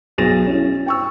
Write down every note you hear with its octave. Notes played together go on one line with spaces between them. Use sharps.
B1 B2 G#4 A6 A#6 E7
C#4 E4
G5 C#6 E6